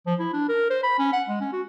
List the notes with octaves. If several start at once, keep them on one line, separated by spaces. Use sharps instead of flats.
F3
E4
D4
A#4
C5
B5
C#4
F#5
G#3
C#4
F#4